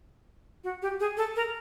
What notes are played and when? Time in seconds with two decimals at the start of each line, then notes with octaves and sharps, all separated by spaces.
0.64 F#4
0.82 G4
1.00 G#4
1.17 A4
1.36 A#4